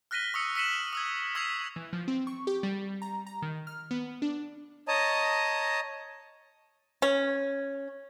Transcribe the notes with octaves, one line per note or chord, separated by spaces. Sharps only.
F6 F#6 A#6 B6 D#7 G7
C#6 D#6 E6 C#7
E6 B6 C#7 D#7 E7 F#7
D#6 E6 G#6
C#6 E6 G#6 B6 C7 F7
E3
F3
C4
C#6
G4
G3
A#5
A#5
D#3
F6
B3
D4
C#5 D#5 A5 A#5 D#6
C#4